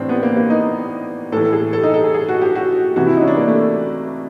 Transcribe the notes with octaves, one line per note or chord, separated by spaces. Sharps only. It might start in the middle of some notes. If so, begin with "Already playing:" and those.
Already playing: A2 E3 C4 D4
B3
A#3
A#3
D#4
A2 E3 A4
G#4
A4
D#4
A4
G#4
G#4
F#4
G4
F#4
C3 E3 F#4
E4
D#4
C#4
D4
A#3
A3